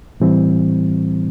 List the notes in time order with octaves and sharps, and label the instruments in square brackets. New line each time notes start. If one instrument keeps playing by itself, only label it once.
[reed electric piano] A2 E3 G3 C4